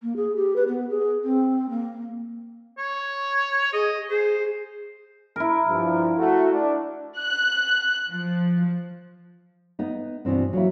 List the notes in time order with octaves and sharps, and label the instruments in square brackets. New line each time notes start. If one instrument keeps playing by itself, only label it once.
[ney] A#3
G#4
G4
B4
B3
G#4
C4
A#3
[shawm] C#5
[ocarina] G#4 [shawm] D#5
[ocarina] G#4 [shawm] C5
[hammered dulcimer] E4 A#4
[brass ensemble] G2 F3
A3 F#4
D4
[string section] F#6
F3
[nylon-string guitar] B3 D#4
G2 B2 E3 C4 D4
F#3 A#3 E4